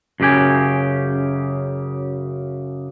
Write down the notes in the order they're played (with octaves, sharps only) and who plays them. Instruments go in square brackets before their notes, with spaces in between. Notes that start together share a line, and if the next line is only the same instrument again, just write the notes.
[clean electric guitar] F#2 C#3 G4 G#5